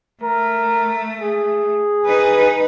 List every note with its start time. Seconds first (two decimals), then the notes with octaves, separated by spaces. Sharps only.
0.22 A3 A#4
1.21 G#4
2.05 D#4 B4